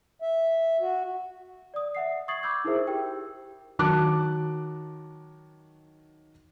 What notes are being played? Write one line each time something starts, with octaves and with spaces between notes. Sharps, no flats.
E5
F#4
D5 D#6
E5 F#5 C7
C#6 D#6 G#6 A6 C7 F#7
B5 D6 E6 G6 G#6
D#4 E4 G#4 A#4 C5 E5
G4 A#4 G5 E6
D#3 F#3 A5 D6 F#6